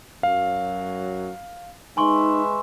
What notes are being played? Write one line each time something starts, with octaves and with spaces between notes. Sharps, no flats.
F#2 F#3 F5
G#3 D#4 B4 E5 G#5 C6 C#6